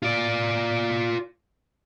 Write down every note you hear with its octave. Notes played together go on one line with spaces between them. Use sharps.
F4 D5